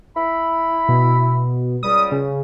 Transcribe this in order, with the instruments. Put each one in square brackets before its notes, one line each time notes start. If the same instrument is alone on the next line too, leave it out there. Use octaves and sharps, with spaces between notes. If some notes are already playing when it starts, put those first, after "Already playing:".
[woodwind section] E4 B5
[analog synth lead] B2
[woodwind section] C#2 G3 [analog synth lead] D#6
[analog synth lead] C#3